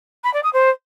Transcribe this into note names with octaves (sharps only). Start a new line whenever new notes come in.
B5
D5
D#6
C5